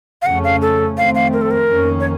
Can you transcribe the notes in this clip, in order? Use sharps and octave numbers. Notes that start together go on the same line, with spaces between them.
F5
F2 C#3 A3 C#4 F#5
F5
A4
F2 D#3 A3 C4 F5
F5
A#4
A4
A#4
F2 D#3 A#3 C#4
C#5